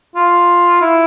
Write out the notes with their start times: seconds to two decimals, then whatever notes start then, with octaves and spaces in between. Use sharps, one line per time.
0.16 F4
0.81 E4